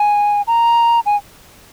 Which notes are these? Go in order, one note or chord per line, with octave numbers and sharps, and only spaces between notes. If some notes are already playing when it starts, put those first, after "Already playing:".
Already playing: G#5
A#5
G#5